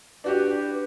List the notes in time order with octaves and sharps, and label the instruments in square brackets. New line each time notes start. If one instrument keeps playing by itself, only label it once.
[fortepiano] D4 F#4 G4 [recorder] B4